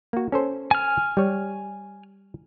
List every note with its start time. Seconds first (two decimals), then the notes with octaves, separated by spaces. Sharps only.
0.13 A#3 F#4
0.32 C#4 A4 C5
0.71 G#5 F6
1.17 G3 C#5